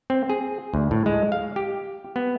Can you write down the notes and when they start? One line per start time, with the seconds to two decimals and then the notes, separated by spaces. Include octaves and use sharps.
0.10 C4
0.30 G#4
0.74 D2
0.91 A2
1.06 G#3
1.32 F5
1.56 G4
2.16 B3